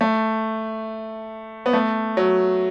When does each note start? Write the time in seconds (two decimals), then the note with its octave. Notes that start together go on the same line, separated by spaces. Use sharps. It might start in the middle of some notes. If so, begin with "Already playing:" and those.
0.01 A3
1.66 B3
1.73 A3
2.17 F#3